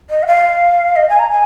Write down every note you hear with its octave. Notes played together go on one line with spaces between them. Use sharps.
D#5
F#5
F5
D#5
G#5
A#5
G#5